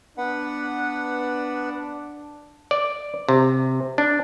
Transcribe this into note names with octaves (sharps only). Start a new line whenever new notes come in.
B3 D4 B4 F#5
D5
C3
D4